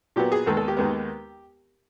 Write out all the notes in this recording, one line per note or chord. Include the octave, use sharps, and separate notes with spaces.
A#2 F#3 B3 G4
G#4
D#2 D#3 G#3 B3 A4
A4
G4
D#2 D#3 G#3 B3